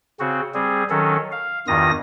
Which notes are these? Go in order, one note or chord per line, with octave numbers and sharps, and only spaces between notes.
C#3 C4 F#4
G3 C4 G#4
D#3 F#3 C#4 A4
F5
E2 G2 D#3 F4 D#6 A#6